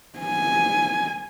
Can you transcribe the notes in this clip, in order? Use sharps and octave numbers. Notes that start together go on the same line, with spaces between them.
G#5